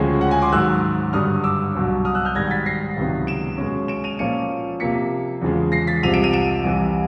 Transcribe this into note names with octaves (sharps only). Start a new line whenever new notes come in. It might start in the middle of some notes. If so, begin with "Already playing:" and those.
Already playing: D2 C#3 F3 G#3 C#4 G5
F#5
F#5 G#5
C6 D6
G#2 D#3 F#3 E6 F#6
G2 D3 F#3 D#6 F6
D6 E6
C2 B2 F#3
D#6 F6
E6 F#6
F6 G6
G#2 D#3 G3 G#6 A#6
A6 B6
A#6 C7
C#2 C3 D#3 F#3 B3
D7 E7
B2 G#3 C#4
D7 E7
D#7 F7
A#2 F3 A#3 C#4 C#7 D#7
C3 F3 A#3 B6 C#7
E2 C#3 F3 G#3
A#6 C7
A6 B6
C2 C3 F3 D#7 F7
D7 E7
D#7 F7
D7 E7
C2 C3 E3